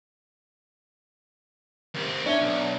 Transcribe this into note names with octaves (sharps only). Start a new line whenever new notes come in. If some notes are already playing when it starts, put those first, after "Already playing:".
D#2 C4
C#4 D4 E5 G7
B1